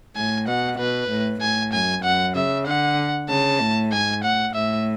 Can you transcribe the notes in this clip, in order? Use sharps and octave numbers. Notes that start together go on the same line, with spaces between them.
A2 G#5
B2 F#5
B2 B4
A2
A2 G#5
F#2 G#5
F#2 F#5
C#3 E5
D3 F#5
C#3 A5
A2
G#2 G#5
A2 F#5
A2 E5